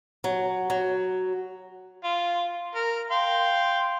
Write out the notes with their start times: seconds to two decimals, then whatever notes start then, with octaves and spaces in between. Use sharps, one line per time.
0.24 F#3
0.70 F#3
2.04 F4
2.75 A#4
3.10 F5 G5 C6